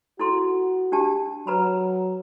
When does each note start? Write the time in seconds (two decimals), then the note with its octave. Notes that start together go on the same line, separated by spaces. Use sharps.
0.19 E4 F#4 A4 C6
0.92 D4 G4 A5
1.47 F#3 B4 A#5 B5